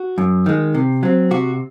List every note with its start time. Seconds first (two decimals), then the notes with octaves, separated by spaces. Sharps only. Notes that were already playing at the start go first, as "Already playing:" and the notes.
Already playing: F#4
0.18 F#2
0.46 D#3 G#3
0.75 C3
1.03 F#3 C4
1.31 C3 F#4